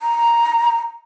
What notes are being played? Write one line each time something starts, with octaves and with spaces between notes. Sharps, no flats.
A#5